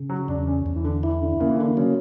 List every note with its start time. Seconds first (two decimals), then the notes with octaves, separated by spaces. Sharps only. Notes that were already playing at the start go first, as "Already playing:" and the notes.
Already playing: C#3
0.09 F#3
0.28 E2 D4
0.47 C#4
0.66 E2
0.76 E3
0.84 D3
1.03 E3 E4
1.21 D3
1.40 C#3 A#3
1.50 E3
1.59 D3
1.77 C#3 F#3